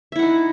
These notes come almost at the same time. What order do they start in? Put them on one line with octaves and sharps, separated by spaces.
E5 E4 F#5 D#4